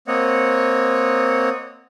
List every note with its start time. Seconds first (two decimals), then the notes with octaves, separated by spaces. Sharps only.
0.07 A#3 C4 C#5 D#5 F#5